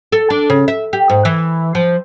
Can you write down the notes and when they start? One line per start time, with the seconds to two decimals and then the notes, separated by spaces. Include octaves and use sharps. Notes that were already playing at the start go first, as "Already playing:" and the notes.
0.12 A4
0.30 D4
0.50 C#3
0.68 E5
0.93 G4
1.10 G#2
1.25 E3
1.75 F3